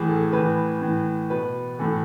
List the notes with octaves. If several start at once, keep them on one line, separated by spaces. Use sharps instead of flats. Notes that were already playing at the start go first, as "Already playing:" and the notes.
Already playing: A2 E3 G#4
A4
A2 E3 B4
A2 E3
B2 B4
A2 E3 A4